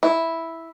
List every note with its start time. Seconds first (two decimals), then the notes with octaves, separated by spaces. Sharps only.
0.03 E4